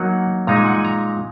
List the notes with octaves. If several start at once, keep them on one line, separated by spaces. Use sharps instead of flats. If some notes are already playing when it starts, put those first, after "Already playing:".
Already playing: F#3 A#3 D#4 F#5
A#2 G#3 D#4 A#5
G#5
F#5
G#5
A#5